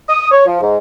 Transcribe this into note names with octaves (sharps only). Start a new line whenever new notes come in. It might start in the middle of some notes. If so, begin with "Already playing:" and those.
D#6
C#5
F3
G#2